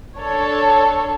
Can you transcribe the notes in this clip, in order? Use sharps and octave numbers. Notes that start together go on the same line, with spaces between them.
D4 A4 C#5